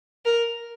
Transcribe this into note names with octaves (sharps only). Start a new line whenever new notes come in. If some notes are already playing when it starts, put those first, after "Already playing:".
A#4